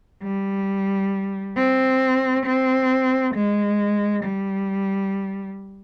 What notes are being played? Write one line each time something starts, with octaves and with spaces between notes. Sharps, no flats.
G3
C4
C4
G#3
G3